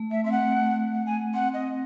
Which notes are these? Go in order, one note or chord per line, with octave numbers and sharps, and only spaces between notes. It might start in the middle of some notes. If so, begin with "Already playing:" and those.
Already playing: A3
A3 E5
C4 E5
F#5
A3
A3
F#5
G#5
C4 F#5
D#5